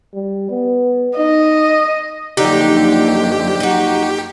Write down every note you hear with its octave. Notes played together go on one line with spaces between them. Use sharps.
G3
B3
D#4 D#5
F#2 D3 F3 A#3 D#4 G4
D#4 F#4